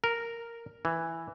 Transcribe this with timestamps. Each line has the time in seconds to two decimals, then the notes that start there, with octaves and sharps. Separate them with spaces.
0.04 A#4
0.85 E3